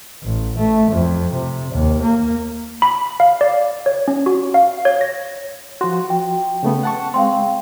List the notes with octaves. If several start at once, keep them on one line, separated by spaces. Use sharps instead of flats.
A1
A3
F2
C3
D#2
A#3
B5
F5
D5
C#5
C#4
F#4
F5
C#5
A#6
F3 F#4 C6
G5
C#3 A3 B3
F#5 A5 C#6
G#3 C4 F5 G5 C6